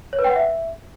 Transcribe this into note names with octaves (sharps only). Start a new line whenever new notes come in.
C#5
B4
G5
F#5
E5